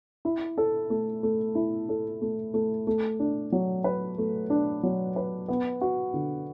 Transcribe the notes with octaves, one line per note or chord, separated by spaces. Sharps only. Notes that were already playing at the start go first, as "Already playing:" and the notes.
E4
A4
A3
A3
E4
A4
A3
A3
A3
D4
F#3
B4
A3
D4
F#3
B4
B3
F#4
D3